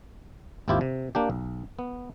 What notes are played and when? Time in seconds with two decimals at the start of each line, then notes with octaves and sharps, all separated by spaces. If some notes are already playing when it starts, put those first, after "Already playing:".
0.68 G#1 D#2 C4 E4 F4 G4
0.81 C3
1.15 A#3 D4 G4
1.30 B1
1.79 B3